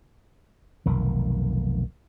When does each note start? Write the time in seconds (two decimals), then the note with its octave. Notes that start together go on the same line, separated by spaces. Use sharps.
0.86 F1 B1 D#3